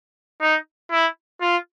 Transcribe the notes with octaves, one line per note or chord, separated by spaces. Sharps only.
D#4
E4
F4